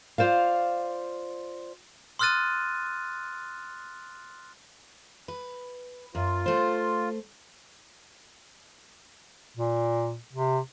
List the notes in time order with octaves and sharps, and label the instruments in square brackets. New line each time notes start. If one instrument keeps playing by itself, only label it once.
[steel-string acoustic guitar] F4 C5 D5 F5
[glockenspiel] C6 D#6 F6 F#6 A6 D#7
[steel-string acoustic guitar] B4
[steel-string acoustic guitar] F#2 [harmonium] F4
[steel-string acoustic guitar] A3 C5
[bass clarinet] A#2
C3